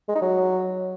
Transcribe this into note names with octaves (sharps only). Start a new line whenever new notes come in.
G#3
D#4
F#3